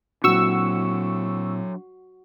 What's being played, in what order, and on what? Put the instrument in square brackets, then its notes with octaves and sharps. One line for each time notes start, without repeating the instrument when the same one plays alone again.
[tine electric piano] A#2 C4 E4 [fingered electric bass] F#3 D4 [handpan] F#4 [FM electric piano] C#6 E6